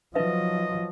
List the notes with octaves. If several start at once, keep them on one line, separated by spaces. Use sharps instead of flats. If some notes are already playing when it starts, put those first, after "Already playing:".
F3 F#3 D#4 B4 D#5 E5